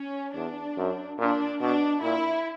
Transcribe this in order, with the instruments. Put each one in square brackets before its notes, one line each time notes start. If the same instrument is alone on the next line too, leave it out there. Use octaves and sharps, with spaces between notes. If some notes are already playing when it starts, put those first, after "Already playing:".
Already playing: [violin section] C#4
[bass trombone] E2 [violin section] D4
[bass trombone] F#2
[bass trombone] A#2 [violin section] D4
[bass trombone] B2 [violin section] D4
[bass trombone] A#2 [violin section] E4